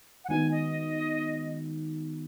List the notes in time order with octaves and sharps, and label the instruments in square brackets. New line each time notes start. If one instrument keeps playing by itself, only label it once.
[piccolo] F#5
[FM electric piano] D#3 G#3 B3 D#4 F#4 [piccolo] G#5
[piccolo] D#5